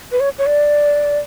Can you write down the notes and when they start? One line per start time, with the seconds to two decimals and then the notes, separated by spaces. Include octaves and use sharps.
0.12 B4
0.20 C#5
0.38 C#5
0.46 D5